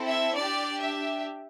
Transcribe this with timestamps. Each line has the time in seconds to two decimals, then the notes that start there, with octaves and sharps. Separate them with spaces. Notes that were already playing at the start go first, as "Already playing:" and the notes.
Already playing: C4 E4 A4
0.08 E5
0.37 D4 G4 D5
0.82 E5